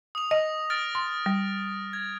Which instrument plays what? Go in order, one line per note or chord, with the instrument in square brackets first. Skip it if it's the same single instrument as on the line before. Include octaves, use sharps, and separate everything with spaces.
[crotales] D#6 F7
[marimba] D#5 [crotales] A#6
[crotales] F6 A6 D7
[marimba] C6
G3
[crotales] G#6